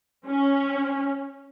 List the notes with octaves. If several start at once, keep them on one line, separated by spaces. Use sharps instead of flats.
C#4